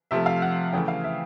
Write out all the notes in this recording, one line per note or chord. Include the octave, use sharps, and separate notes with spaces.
C3 F3 A3 E5
F5
F#5
C#3 E3 A3 G5
F5
E5